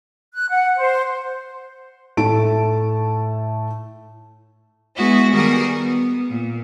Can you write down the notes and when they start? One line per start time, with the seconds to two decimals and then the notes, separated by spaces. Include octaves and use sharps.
0.34 F#6
0.49 F#5
0.76 C5
2.17 A2 A3 A5 D7
4.96 G#3 B3 E4 F#4
5.32 D#3 G3 B3 F#4 G#4 A#4
5.78 B3
6.31 A#2